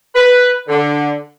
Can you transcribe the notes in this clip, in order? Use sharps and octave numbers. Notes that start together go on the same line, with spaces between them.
B4
D3